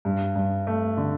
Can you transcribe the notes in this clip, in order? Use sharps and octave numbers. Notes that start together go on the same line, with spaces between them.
G2
G2
A3
D3